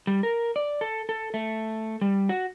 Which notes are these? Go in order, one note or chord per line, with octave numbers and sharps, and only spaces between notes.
G3
A#4
D5
A4
A4
A3
G3
F#4